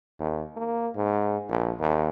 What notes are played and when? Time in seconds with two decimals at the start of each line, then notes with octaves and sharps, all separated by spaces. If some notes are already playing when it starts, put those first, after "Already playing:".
0.20 D#2
0.56 A#3
0.95 G#2
1.49 A#1
1.80 D#2